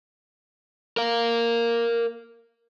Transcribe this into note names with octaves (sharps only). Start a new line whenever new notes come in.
A#4 F5